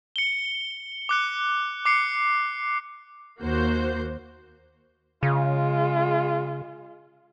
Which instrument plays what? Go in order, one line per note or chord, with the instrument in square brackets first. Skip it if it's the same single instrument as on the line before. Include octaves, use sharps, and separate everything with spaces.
[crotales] C#7 G7
D6 F#6 C#7
D6 C7 C#7
[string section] D#2 A#3 F#4 C5 G6
[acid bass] C#3 [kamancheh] G#3 F4